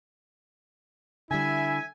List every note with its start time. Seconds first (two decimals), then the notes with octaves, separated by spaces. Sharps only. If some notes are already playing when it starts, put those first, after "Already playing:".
1.31 D3 G3 E4 E5 G#5